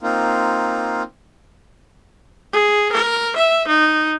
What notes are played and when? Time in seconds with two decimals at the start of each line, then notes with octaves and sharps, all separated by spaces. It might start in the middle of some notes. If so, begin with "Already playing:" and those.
0.01 A#3 C4 D#4 F4
2.53 G#4
2.93 A#4
3.37 E5
3.68 D#4